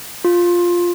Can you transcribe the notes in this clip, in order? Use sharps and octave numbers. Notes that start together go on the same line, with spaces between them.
F4